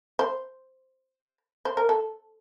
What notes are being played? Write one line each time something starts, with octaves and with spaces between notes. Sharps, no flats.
C5
C5
A#4
A4